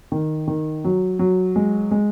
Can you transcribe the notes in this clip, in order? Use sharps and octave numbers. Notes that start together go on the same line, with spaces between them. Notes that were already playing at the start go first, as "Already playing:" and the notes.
D#3
D#3
F#3
F#3
G#3
G#3